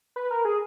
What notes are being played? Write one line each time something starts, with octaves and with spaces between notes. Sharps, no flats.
B4
A#4
G#4